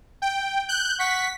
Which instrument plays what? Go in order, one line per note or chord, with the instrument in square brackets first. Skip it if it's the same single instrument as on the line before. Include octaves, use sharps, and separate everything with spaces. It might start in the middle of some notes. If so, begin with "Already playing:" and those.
[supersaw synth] G5
F#6 G6
[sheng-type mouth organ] F#5 C#6 [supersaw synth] B6